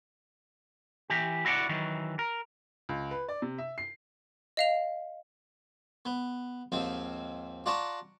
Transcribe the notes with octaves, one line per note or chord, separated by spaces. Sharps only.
E3 G4
E4 F#4 G#4 C#5 D5 F#5
D#3 E3 F#3
A#4
C#2
B4
D5
C3
E5
C7
D#5 F5 F7
B3
D#2 G#2 F3 C4
F4 D5 F#5 A5 A#5 C#6